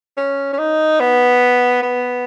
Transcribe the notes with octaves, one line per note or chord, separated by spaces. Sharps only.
C#4
C#4
D#4
B3
B3